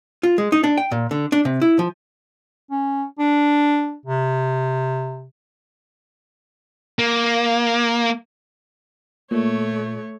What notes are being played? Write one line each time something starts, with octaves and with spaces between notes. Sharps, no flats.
F4
G#3
D#4
D4
G5
A#2
D3
D4
C3
E4
F3
C#4
D4
C3
A#3
A#2 A3 C#5